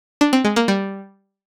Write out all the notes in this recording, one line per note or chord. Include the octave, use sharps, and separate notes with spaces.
D4
C4
G#3
A#3
G3